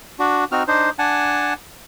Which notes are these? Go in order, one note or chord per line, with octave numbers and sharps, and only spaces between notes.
D4 F#4
C4 D#4 F#4 F6
D4 D#4 C5
D4 F#5 G#5 A5